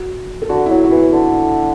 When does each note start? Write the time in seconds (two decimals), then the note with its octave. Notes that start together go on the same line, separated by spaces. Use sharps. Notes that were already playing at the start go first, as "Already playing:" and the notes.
Already playing: F#4
0.42 A4
0.49 D3 F#4
0.66 E4
0.70 F#3 F#4
0.84 F#4
0.91 E3 E4
1.13 D3